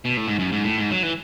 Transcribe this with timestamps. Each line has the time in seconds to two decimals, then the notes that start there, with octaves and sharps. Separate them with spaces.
0.05 B2
0.17 A2
0.28 G#2
0.39 F#2
0.52 G#2
0.64 A2
0.78 G#2
0.91 F#3
1.03 E3